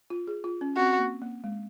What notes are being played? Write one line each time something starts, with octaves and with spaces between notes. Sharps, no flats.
F4
G#4
F4
C#4
C4 F#4
A#3
A#3
G#3